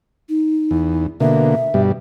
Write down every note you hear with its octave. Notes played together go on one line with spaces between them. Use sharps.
D#4
E2
B2 D3 A#3 E5
G2 B2 G3